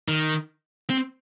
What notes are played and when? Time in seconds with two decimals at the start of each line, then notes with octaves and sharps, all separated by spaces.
0.08 D#3
0.90 C4